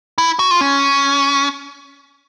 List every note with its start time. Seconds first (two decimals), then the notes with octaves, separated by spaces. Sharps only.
0.18 E4
0.39 F#4
0.51 F4
0.61 C#4